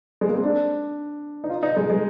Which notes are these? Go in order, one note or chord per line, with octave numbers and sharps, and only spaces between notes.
G#3
A#3
C4
D4
D#4
F4
D#4
G#3
G#3